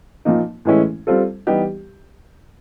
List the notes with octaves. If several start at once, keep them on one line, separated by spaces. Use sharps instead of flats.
A#2 F3 A#3 D#4
A2 E3 G#3 C#4 E4
G3 C4 F4 A4
E3 G3 B3 D#4 G4